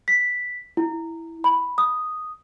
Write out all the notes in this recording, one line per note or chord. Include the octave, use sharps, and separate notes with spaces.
B6
E4
B5
D#6